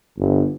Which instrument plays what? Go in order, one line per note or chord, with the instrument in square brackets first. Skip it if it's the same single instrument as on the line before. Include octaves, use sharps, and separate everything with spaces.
[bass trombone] G1